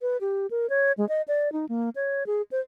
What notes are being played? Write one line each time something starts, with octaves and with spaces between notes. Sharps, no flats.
B4
G4
A#4
C#5
G#3
D#5
D5
D#4
A#3
C#5
G#4
C5